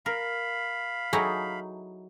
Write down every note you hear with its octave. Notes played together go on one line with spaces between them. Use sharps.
A#4 F5 B5
F#3 D#4 E4 G#4 A4